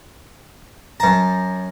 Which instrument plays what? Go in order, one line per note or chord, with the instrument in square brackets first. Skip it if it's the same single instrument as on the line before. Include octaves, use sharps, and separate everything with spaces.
[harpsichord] F#2 A5 [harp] A#5